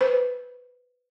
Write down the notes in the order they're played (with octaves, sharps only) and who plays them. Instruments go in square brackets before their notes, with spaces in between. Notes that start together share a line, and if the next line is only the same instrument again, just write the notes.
[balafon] B4 C5